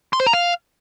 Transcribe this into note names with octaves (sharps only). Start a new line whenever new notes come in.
C6
C5
A#5
F5